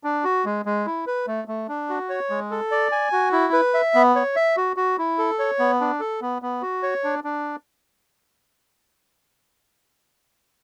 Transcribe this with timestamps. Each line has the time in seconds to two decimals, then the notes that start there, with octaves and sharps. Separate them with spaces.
0.04 D4
0.24 F#4
0.45 G#3
0.66 G#3
0.86 E4
1.07 B4
1.27 A3
1.48 A3
1.68 D4
1.89 F#4
2.09 C#5
2.30 G#3
2.51 A4
2.72 D5
2.92 G#5
3.12 F#4
3.32 E4
3.53 B4
3.74 E5
3.95 B3
4.16 C#5
4.36 E5
4.57 F#4
4.76 F#4
4.98 E4
5.18 A4
5.39 C#5
5.59 B3
5.81 D4
6.00 A4
6.21 B3
6.42 B3
6.62 F#4
6.83 C#5
7.04 D4
7.24 D4